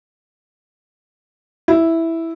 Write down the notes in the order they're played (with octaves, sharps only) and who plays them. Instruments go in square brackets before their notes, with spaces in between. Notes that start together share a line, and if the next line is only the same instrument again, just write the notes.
[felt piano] E4